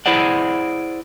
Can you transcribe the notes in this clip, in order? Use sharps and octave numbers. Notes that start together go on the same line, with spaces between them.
E4 G#4 C5 D5 F#5